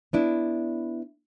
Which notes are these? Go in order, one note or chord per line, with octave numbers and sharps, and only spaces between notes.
B3 D4 E4